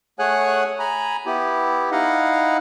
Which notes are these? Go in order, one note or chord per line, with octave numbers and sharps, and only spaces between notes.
A3 G#4 C#5 F#5 G#5 F#6
G#5 A#5 B5
B3 E4 G4
D#4 E4 D#5 F5 F#5